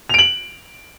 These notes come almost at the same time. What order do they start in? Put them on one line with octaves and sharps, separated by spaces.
F7 D7 F#7